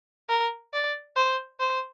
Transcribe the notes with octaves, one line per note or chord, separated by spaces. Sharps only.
A#4
D5
C5
C5